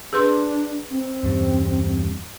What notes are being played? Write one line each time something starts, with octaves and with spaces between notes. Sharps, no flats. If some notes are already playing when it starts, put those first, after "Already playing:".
D4 G#4 B4 C6
C4
E2 G2 G3